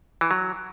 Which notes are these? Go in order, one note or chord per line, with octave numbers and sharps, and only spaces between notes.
E3
F#3